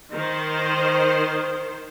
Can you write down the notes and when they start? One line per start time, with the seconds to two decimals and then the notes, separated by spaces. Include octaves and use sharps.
0.13 D#3 C5